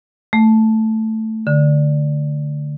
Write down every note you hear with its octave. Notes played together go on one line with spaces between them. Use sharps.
A3
D3